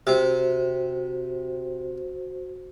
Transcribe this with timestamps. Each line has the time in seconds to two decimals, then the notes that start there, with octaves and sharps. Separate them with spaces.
0.07 C3 F#4 C5